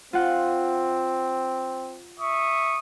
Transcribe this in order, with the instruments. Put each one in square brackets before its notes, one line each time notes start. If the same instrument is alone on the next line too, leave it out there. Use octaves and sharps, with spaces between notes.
[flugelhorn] C4 [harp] F4 F#5
[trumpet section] E5 C#6 D#6